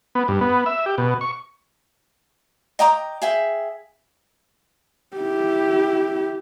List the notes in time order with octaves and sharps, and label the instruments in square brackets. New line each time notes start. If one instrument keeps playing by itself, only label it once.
[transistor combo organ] B3
G2
B3
E5
G4
B2
C#6
[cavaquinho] D#5 G5 A#5 D6
G#4 E5 G5
[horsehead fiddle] E4 G4